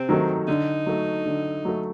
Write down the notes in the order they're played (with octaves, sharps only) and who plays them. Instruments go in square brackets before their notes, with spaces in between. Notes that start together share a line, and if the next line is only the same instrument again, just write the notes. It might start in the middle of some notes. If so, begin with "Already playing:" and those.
Already playing: [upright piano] C3 [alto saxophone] C4
[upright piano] D#3 F#3 A3 D#4
[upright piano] D3 [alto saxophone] D#4
[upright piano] F#3 A3
D3
F#3 A3